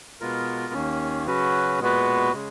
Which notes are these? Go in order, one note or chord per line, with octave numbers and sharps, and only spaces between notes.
B2 G#3 B3 F4 A#4
D#2 D#3 A#3 C#4
C#3 F#3 C#4 F#4 B4
A#2 G#3 B3 F#4 B4
C#3 G#3